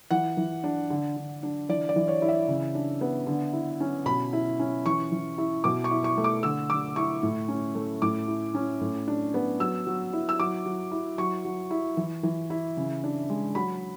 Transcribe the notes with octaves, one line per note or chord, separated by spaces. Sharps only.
E3 F#5
E3
D4
D3
D3
D4
E3 D5
D5
E3
C#5
E4
E5
C#3
D4
B3
D3
E4
C#4
B2 B5
E4
C#4
E3 C#6
E3
E4
B2 D6
C#6
E4
C#6
A3
D6
D3 E6
D3 D6
E4 C#6
A2
C#4
A3
A2 D6
E4
C#4
A2
D4
B3
F#3 E6
F#3
E4
E6
F#3 D6
F#3
E4
F#3 C#6
F#3
E4
E3
E3
E4
C#3
D4
G#3
F#3 B5